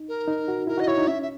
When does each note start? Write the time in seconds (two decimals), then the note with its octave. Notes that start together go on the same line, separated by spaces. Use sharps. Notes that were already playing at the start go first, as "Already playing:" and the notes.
Already playing: D#4
0.08 A#4
0.28 D#4
0.48 F#4
0.67 E4 A#4
0.78 F#4 D#5
0.87 E4 C#5
0.98 D#4
1.07 C#4 E5
1.22 E5